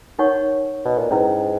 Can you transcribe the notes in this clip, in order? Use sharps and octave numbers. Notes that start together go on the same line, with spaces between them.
D#4 A#4 C#5 F#5 C#6
B2
A#2
G#2 C#4 E4 B4